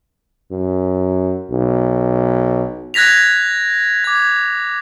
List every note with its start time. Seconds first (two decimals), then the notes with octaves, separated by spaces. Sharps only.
0.51 F#2
1.51 B1
2.94 F#6 G#6 A#6 B6 F7
4.04 D6 G#6